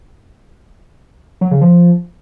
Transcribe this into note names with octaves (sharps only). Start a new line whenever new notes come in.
F#3
C#3
F3